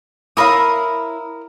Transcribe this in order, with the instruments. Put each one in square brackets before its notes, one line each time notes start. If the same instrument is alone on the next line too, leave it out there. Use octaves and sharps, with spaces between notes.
[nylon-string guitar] E4 C#5 F5 [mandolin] A#4 B5 D#6